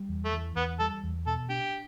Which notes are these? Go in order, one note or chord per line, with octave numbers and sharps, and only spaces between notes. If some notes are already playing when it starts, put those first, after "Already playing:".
Already playing: G3
E2
A3
E3
E2 B3
G3 A4
E2
B2 A4
D4 G4